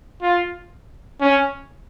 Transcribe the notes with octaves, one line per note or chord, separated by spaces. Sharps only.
F4
C#4